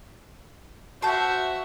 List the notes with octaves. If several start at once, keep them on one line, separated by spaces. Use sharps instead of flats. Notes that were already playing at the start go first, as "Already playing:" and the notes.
F#4 C5 E5 A5 G6